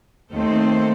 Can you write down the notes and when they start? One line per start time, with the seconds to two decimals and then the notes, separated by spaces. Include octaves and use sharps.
0.31 D#2 D#3 A3 C4 A4 C5